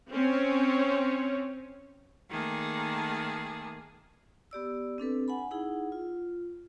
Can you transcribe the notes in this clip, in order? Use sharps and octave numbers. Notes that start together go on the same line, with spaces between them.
C4 C#4 C#5
D#3 A3 A#3 G#4 A5
B3 G4 D5 E6
C4 D4 A4 B4
F#5 G#5 B5
D#4 E4 G#4 F#5
F4